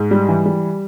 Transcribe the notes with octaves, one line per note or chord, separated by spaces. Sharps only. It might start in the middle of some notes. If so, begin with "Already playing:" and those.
Already playing: G#2
G3
E3
G3